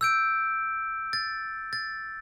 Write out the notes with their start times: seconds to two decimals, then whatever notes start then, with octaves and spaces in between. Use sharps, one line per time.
0.01 E6 G6 D7
1.13 A6
1.73 A6